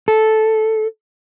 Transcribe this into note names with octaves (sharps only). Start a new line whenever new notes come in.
A4